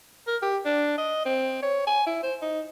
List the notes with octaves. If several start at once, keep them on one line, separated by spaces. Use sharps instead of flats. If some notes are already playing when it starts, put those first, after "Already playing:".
A#4
G4
D4
D#5
C4
C#5
G#5
E4
C5
D#4